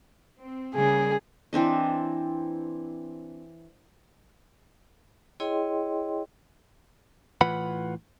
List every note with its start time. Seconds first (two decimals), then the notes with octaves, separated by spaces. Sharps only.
0.42 C4
0.75 C#3 G3 A#3 G#4
1.53 E3 C4 D4 D#5
5.40 E4 G#4 C#5 D#5 G5 C6
7.41 A2 E3 F4 B4 F#5 B5